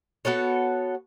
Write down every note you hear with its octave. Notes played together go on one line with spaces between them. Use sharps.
B3 F#4 A4 C#5